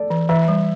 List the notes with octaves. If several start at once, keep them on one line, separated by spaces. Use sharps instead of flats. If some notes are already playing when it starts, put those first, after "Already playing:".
Already playing: A4 D5
E3
E3 E5
G3